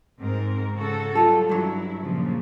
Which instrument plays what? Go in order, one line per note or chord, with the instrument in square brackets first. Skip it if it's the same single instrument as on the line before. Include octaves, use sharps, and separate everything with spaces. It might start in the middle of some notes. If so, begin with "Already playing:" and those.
[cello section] G#2 C4 A#4
C#3 F#4 A4
[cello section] F#3 G3 [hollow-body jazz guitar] F4 A4
[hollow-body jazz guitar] G2 F#3 [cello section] E4
[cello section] A#2 C#3 F3